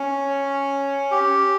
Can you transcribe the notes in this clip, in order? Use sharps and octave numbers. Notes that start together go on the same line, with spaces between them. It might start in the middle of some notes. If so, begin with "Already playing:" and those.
Already playing: C#4
G4